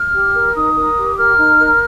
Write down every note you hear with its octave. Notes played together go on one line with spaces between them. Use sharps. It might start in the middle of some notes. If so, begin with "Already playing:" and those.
Already playing: F6
G4
A#4
D#4 D#6
A#4
G4
A#4 F6
D#4
A#4